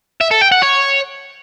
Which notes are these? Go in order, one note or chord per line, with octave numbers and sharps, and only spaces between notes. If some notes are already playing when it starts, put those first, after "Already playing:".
E5
A4
G5
F#5
C#5